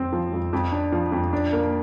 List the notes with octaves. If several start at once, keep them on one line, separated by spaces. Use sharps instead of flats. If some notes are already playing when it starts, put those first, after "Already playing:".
Already playing: F2 C4
F3
F2
F2
D4
F3
F2
D4
A#3